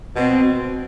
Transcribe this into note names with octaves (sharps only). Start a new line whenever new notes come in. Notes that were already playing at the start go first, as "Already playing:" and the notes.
B2 C4